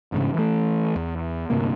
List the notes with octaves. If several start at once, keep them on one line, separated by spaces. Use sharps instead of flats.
A1 G#2 C#3
E3 A3
E2
D2 G2 C3 A#3